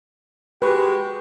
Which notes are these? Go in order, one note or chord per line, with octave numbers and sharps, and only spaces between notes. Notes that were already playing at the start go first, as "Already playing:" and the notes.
G#3 F#4 G4 B4